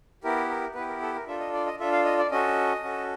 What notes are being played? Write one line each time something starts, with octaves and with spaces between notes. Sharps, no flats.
B3 E4 G4 A#4
A#4
B3 E4 G4 B4
A#4
A4
A#4
D4 F4 A4 E5
D#5
D5
D#5
D4 F4 A4 E5
F5
D#5
D5
C#4 F#4 A4 D#5
C#4 F#4 A4